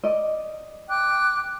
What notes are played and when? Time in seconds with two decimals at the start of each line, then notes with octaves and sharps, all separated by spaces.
0.04 D5 D#5
0.88 G5 D6 F#6